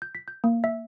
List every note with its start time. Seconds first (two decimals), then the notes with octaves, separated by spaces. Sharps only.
0.02 G6
0.15 B6
0.28 G6
0.44 A#3
0.64 E5